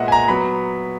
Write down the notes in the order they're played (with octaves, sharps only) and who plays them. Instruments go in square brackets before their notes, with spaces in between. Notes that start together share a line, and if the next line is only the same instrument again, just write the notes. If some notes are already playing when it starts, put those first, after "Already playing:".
Already playing: [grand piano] A#2 G#3 B3 D#5 E5 F#5
G#5
A#5
F#3 B3 B5